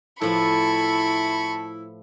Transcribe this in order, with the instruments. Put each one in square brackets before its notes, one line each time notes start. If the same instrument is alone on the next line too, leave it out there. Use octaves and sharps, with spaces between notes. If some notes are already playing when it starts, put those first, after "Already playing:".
[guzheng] A2 F3 B4 [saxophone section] E4 [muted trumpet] A5 [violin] B5 C#6